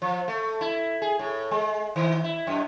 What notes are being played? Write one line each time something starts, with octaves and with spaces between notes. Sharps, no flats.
F3
A3
E4
G#4
A2
G#3
D#3
E4
F#2